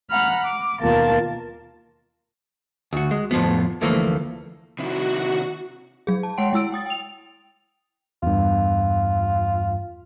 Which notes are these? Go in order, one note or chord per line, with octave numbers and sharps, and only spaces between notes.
F#5 A#5 B5 F6
D6
D#2 B2 A#3 F4 A#4 A5
D2 F#4
G#3
F2 A2 F3 B3
D2 E3 F3 A3 A#3
C3 D#3 E4 F#4
F#3 G#4
A5
G#3 C#5 F#5 G5 C6 D7
G#3 E4 E6 D7
G5 D#6 A6
G5 F7
E2 G2 F4